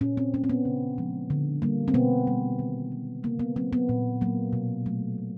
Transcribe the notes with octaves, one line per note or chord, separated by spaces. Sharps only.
A#2 C#4
C4
F#3 A#3 C#4
C4
B3
C#3
F3 G#3
D3
G3 A#3
C4
B2 B3
G3 A#3
D#3
G#3
C#3 A#3
B3
F#3 A#3 C4
B3
A#2
F#3 A#3
B2
F#3 A3
B2